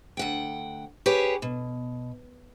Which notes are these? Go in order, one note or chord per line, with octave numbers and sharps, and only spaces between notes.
D2 F#5 G5
G4 G#4 B4 C#5
B2